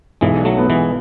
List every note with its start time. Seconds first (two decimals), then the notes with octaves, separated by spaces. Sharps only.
0.21 B1 E3 G#3
0.45 F#3 A3
0.58 B3
0.70 E3 G#3